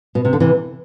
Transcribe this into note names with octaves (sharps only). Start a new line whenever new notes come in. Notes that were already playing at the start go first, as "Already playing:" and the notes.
B2
C3
D3
C3 E3